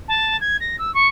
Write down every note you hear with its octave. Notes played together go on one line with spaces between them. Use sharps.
A5
G#6
A#6
E6
C#6